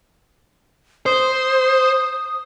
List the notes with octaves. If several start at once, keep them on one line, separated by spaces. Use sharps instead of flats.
C5 D#6